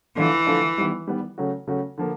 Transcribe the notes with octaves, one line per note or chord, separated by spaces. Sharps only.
D3 E3 F3 A3 D4 F4
D3 F3 A3 D4 F4
D#3 G3 B3
D#3 G3 B3
C#3 F#3 A3 C#4 F#4
C#3 F#3 A3 C#4 F#4
D3 F3 A#3